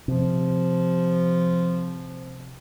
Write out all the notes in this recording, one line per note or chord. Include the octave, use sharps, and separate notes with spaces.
C3 F3